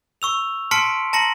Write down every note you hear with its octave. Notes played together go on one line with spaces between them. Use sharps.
C#6 E6 F7
A5 C6 F6 B6 C#7 D7
A5 A#5 A#6 C#7 F#7